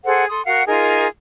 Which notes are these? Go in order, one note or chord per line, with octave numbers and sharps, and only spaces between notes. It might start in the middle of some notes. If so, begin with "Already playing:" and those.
G#4 A4 C5 F#5
A4 C6 D#6
F#4 A#4 F5 F#5
D#4 F4 G#4 A#4